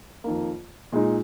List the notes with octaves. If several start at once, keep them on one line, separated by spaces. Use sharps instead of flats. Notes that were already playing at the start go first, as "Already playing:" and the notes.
F2 D#3 A#3
A#2 G#3 D#4